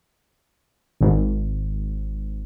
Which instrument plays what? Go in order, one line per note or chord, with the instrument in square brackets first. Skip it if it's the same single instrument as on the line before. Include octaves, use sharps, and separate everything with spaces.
[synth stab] G#1